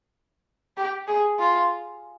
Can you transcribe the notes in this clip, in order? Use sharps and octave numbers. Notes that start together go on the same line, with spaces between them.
G4
G#4
F4